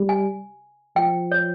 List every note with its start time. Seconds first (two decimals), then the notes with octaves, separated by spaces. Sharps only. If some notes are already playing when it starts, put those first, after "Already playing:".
Already playing: G3
0.09 G#5
0.96 F3 G5
1.32 C#5